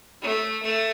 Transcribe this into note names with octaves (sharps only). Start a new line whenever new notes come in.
A3
A3